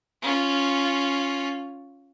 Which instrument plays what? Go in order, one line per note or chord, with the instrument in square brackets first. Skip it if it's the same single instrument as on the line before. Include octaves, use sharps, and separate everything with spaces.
[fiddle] C#4 F4